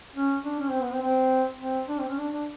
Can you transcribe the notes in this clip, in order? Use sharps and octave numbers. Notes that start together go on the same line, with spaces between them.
C#4
D4
C#4
C4
B3
C4
C4
C4
D4
C4
C#4
D4
D4